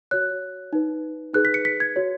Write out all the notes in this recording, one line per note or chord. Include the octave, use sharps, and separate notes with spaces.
F#4 C#5 F#6
D#4 B4
D#4 G#4 B4 F#6
B6
C#7
B6
G#6
F#4 C#5